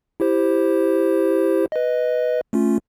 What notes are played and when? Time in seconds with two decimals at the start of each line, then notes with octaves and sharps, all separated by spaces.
0.20 E4 G4 C5
1.72 B4 D#5
2.53 A3 C#4 F4